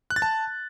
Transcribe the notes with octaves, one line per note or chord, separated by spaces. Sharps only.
F#6
A6
A5